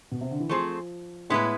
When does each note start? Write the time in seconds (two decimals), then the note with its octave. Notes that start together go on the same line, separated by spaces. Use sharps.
0.12 B2
0.21 C3
0.31 D3
0.40 E3
0.49 F3 A3 C4 G#4 C5
1.30 A2 G#3 B3 E4 B4